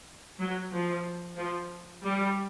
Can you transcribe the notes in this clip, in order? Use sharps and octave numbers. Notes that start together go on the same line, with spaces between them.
F#3
F3
F3
G3